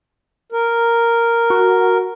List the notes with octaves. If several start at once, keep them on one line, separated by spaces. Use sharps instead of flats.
A#4
F#4